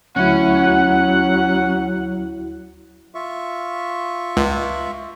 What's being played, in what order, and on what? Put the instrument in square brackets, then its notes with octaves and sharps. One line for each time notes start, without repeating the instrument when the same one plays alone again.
[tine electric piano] D2 E4 [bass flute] F#3 [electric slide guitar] C#4 [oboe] F#5
[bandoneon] F4 E5 C#6
[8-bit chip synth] C#2